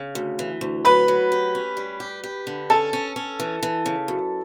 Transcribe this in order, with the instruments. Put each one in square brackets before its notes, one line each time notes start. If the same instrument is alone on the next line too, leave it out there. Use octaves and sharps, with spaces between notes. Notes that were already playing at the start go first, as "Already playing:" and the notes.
Already playing: [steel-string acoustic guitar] C#3
D2
E3
D2
[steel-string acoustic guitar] F#3 [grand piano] B4 B5
[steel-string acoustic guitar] F#3
G4
C#4
G3
G4
G4
D3
[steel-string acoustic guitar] C#4 [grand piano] A4 A5
[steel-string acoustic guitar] C#4
C#4
E3
E3
C#3
F#2